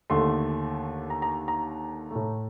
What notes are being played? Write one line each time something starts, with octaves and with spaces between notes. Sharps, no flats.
D#2 D3 A3 C6
A#5
A#5
A#5
A2 A3